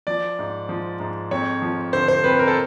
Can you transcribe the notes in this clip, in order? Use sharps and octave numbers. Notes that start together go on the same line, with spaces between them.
F3 D5
G#2
F3
G#2
F2 C#5
F3
D3 C5
C5
F2 B4
A#4
A4